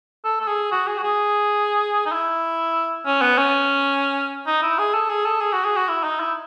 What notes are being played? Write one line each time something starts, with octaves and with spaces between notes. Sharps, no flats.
A4
A4
G#4
F#4
G#4
F#4
G#4
D#4
E4
C#4
B3
C#4
D#4
E4
G#4
A4
G#4
A4
G#4
F#4
G#4
F#4
E4
D#4
E4